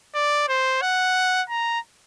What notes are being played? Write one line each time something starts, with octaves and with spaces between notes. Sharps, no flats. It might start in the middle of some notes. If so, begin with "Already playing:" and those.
D5
C5
F#5
A#5